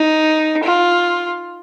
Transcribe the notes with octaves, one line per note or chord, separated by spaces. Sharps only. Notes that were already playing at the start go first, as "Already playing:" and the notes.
Already playing: D#4
F4